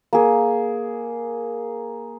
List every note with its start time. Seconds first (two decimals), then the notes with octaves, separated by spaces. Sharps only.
0.13 A#3 G#4